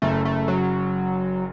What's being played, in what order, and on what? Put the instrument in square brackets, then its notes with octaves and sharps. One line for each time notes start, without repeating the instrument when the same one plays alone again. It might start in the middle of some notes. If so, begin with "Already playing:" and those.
[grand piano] F#1 F#2 C#3 [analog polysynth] A3
[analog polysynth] A3
F#3